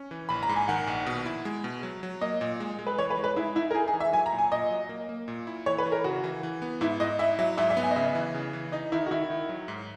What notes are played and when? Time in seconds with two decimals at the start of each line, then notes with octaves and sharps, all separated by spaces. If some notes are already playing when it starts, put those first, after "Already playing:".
Already playing: C#4
0.11 E3
0.29 A#1 B5
0.43 A#5
0.49 G#2
0.56 G#5
0.68 D#3 F#5
0.87 A#1
1.07 B2
1.26 E4
1.45 G#3
1.64 B2
1.83 F#3
2.03 F#3
2.21 A#3 D#5
2.41 A#2
2.60 G#3
2.79 G#3
2.87 B4
2.98 E3 C#5
3.10 B4
3.17 G#3
3.24 B4
3.36 G#3 E4
3.55 D#4 E4
3.71 A#4
3.75 D#4 G#4
3.88 G#4
3.93 E3
4.00 E5
4.13 F#3 G#5
4.26 A#5
4.32 A#2
4.38 G#5
4.51 A#2 D#5
4.71 F#3
4.89 A#3
5.09 A#3
5.28 A#2
5.47 E4
5.66 E3 C#5
5.78 B4
5.86 E3
5.92 A#4
6.04 C#3 F#4
6.24 E3
6.43 E3
6.62 B3
6.81 G#2 E4
7.00 G#2 D#5
7.19 E4 E5
7.39 F#3 E5
7.57 G#2 E5
7.70 E5
7.77 B3
7.83 G#5
7.91 D#5
7.96 C#3 E5
8.15 E3
8.34 C#3
8.53 E3
8.72 D#4 D#5
8.92 D#3 E4
9.06 F#4
9.11 D#3 E4
9.30 D#3
9.49 F#3
9.68 G#2